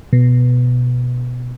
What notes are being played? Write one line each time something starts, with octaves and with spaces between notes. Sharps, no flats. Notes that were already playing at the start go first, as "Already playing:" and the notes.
B2